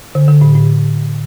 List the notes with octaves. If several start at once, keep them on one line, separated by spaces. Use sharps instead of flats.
D3
D3
A2
A2